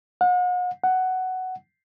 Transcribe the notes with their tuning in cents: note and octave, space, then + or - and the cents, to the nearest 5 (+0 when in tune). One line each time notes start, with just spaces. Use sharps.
F#5 -40
F#5 +10